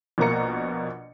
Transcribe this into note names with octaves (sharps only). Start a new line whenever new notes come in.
A#1 B2 A#3 A#5 C#7